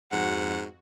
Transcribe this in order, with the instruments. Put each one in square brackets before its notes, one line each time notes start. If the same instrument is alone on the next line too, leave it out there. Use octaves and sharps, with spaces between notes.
[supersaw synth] F2 F#4 [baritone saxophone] G#2 [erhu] F#5